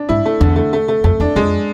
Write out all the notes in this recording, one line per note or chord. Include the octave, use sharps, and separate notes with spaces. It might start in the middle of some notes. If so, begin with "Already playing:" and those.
Already playing: D4
G#2 E4
A3
E2 D3
A3
A3
A3
F2 A3
E2 D4
F2 G#3